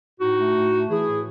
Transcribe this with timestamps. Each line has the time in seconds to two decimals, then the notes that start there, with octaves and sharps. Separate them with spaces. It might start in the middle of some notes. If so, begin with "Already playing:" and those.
0.20 A2 D#4 F#4
0.37 A3
0.55 A2
0.72 A3
0.89 E3 E4 G#4
1.07 A2